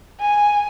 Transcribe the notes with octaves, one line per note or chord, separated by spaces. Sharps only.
G#5